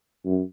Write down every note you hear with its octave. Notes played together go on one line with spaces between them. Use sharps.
F#2